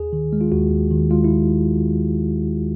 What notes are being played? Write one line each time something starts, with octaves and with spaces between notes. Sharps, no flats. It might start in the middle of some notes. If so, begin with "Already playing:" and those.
Already playing: D#2 G#4
D#3
G#3
F4
D#2 F#4
D#2
D#3
G#3 F4
E4